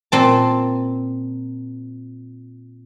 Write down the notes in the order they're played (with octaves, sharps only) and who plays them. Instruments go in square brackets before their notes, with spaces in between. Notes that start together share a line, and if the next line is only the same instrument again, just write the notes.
[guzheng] A#2 C4 A5